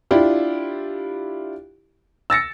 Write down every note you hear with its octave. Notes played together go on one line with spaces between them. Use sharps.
D4 E4 F4 G4
E6 A6 A#6 C#7